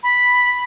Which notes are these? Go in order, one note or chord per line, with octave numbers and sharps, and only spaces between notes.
B5